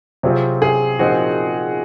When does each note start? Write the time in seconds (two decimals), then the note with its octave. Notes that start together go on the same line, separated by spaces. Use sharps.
0.23 C3 F#3 C4 F4 G#4
0.62 G#4
0.99 A#2 F3 C4 D#4 F#4 G#4